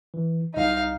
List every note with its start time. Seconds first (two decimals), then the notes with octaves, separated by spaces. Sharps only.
0.14 E3
0.54 C2 D#4 D#5 F5